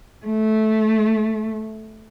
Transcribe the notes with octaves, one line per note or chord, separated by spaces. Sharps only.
A3